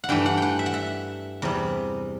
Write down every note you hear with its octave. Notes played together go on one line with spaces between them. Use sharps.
F#5
G2 E3 A3 G5
F#5
F#5 G5
E5
F#5
E5
E2 C3 G3